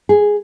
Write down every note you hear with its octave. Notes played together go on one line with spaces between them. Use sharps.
G#4